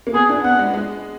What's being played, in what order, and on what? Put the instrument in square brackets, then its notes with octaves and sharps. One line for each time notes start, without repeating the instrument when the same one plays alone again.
[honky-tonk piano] A#3
[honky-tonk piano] B3 [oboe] G#4
[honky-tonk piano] D4
[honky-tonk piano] B3 [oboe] F#5
[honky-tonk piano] G#3
G#3